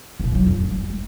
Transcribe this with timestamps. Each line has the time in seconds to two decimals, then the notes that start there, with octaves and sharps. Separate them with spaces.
0.20 C2 A#2
0.32 E3 F#3
0.43 F2 F4
0.56 A1
0.71 G#1 G3
0.90 G#3